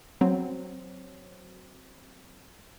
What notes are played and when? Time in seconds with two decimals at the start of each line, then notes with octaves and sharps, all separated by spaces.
0.21 F#3 C4